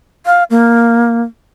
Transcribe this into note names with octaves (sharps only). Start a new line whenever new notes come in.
F5
A#3